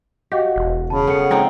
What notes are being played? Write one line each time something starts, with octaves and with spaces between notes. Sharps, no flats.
F#4 G4 D#5 F5
E1
C#3 A5 B5
B3 A4 F#5 C#7
G#3 C4 D#4 F4